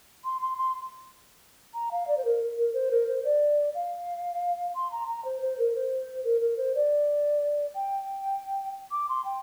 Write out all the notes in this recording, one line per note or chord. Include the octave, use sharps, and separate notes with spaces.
C6
C6
C6
A#5
F5
D5
C5
A#4
A#4
C5
A#4
C5
D5
F5
C6
A#5
A#5
C5
C5
A#4
C5
A#4
A#4
C5
D5
G5
D6
C6
G5